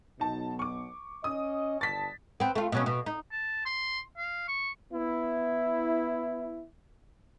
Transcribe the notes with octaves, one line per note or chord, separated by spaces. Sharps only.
B1 B2 D#4 A5
C#6 D6
C#4 D#5 D#6
G1 G3 A5 A6 B6
B3 C4
A3 F4
B2 F#3 C#4
B2
D#4
A5
C6
F5
C#6
B3 E4